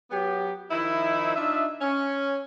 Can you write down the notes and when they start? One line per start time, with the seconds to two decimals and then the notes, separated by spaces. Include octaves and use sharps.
0.11 F#3 B3 G4
0.70 D#3 F3 D#4 E4
1.36 D4 D#4 F4 E5
1.80 C#4